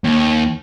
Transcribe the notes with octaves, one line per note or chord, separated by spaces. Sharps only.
D#2